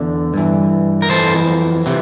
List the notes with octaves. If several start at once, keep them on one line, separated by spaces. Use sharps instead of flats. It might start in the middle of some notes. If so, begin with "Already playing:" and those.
Already playing: E2 D3
G2 E3
A#4
F2 C3 E3 A4 C5
C3 E3